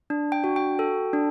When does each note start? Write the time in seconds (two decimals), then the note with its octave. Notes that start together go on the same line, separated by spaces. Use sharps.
0.10 D4
0.32 G5
0.44 F#4
0.56 G5
0.79 A4
1.13 D4